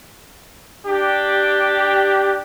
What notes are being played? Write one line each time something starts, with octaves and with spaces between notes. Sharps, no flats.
D4 G4